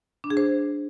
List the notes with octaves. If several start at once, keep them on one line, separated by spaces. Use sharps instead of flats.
D4
G#4
C5